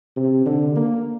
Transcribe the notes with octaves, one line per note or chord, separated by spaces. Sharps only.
C3
D3
A#3